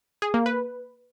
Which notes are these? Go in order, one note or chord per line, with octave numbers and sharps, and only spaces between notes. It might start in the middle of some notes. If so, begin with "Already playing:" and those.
G#4
A#3
B4